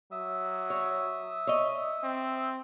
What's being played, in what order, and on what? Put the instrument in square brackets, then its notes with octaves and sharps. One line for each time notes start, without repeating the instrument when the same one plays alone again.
[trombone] F#3 [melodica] E5 D#6 E6
[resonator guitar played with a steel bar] C#5
C#5 D#5
[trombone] C4